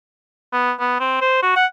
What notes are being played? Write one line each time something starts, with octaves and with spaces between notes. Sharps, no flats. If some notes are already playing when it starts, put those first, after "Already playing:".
B3
B3
C4
C5
F#4
F#5